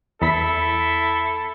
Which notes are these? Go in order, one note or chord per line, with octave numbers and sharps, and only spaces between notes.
E2 E4 A4 B5 B6